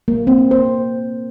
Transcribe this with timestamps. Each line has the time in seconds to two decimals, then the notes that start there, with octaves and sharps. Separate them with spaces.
0.08 A#3
0.27 C4
0.51 C5